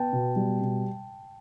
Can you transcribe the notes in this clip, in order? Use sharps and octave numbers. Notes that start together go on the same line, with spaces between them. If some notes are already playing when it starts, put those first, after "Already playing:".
Already playing: B3 G5 A5
B2
G3
B2